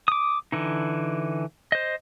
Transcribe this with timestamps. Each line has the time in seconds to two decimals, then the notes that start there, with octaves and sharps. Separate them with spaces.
0.08 D6 D#6
0.52 D3 E3 D#4
1.72 C5 D#5